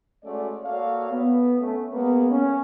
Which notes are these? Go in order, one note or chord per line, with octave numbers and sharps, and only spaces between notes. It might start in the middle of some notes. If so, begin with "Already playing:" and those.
G#3 A3 C#4 F#4 D5
A#3 F#4 A4 C#5 D5 F5
B3
A3 C#4
G#3 A#3 B3
C#4